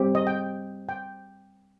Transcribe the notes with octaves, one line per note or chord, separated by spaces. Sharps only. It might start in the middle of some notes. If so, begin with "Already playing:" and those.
Already playing: G3 C4 G4
D#5
G5
G5